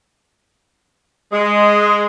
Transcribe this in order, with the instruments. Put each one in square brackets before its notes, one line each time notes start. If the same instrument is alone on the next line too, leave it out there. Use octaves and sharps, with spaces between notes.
[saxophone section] G#3